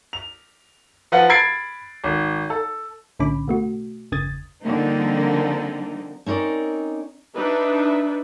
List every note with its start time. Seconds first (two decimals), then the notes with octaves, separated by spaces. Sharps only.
0.13 F7
1.12 F3 F4 B4 F#5
1.29 B5 G#6 A6 C7 D7
2.04 G#1
2.50 A4
3.19 B1 A2 D3 C#4 B5 D6
3.48 B2 A3 F#4
4.12 G1 E2 C#3 D#6 G#6 A6
4.63 D3 F3 G3 A#3 C4 D#4
6.26 C4 C#4 D#4 A#4 D5
7.35 D4 D#4 B4 E5